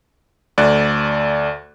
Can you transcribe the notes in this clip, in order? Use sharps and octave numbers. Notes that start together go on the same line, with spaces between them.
D2 A3 D5 F#6